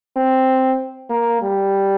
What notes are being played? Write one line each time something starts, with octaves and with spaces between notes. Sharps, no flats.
C4
A#3
G3